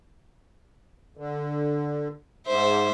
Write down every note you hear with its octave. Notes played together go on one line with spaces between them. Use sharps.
D3
G#2 C5 E5